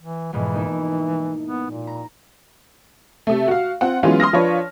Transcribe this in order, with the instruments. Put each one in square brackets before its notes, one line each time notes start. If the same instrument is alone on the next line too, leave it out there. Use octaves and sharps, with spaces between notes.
[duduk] E3
[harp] F2 G#2 B2 [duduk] E3
[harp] A#3 D#4 E4
[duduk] B3
A#2
[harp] A#5
[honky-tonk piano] C3 A3
F#4 F5
C4 F4 F#5
E3 F#3 G#3 B3 C#4 F4
C6 D#6 F6 A#6
F3 D4 F4 B4 C#5